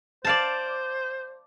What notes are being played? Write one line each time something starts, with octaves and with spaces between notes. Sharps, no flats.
C5 D5 F5 A5